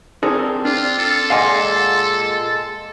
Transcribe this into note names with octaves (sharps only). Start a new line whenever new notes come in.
C4 D4 G#4 A#4
D4 F4
A4
A#2 G#3 F5 F#5 G#5